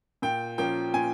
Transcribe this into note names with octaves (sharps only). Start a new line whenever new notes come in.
A#2 G5
F3 A#3 C#4 G5
A#2 G#5